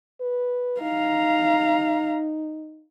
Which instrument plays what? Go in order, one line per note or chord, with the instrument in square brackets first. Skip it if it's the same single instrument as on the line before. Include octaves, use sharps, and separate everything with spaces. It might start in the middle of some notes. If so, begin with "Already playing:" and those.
[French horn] B4
[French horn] D#4 [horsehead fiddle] F5 A#5